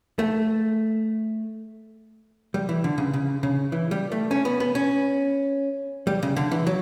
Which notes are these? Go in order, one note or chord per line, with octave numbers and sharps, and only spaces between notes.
A3
G3
E3
D3
C#3
C#3
C#3
E3
G3
A3
C#4
B3
B3
C#4
G3
C#3
D3
E3
F#3